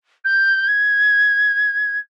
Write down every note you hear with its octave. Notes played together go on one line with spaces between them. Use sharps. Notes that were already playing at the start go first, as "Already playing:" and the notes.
G6
G#6